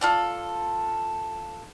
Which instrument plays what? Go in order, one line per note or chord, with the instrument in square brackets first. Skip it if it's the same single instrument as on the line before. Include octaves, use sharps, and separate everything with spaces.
[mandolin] F4 A4 D5